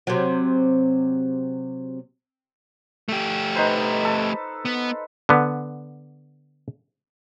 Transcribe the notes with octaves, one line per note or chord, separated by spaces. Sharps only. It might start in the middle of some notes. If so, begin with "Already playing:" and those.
C3 F#3
A3 G4
D#4 B4 C5
A4
B3
D3 B3